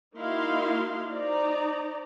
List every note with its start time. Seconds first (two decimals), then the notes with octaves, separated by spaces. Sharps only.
0.16 A#3 D#4 E4 F#4 F5 C6
1.10 D#4 C5 D5 A#5